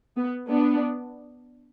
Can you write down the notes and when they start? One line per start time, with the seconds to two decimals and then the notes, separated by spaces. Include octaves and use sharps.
0.17 B3
0.49 B3 D4